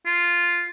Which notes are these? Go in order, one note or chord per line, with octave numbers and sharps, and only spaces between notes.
F4